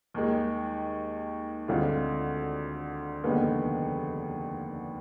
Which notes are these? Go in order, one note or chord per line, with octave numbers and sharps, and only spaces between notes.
D#2 D#3 G#3
D2 D3 G#3 C4 F4
F1 D#2 D3 G#3 B3